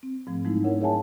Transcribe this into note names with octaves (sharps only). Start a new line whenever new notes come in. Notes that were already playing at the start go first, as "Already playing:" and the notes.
C4
G#2 F3 A3
F3 F#3 G#3 A3 D#4 E4
D4 E4 A#4 C#5 F#5
G#4 C#5 E5 F#5 G#5 A5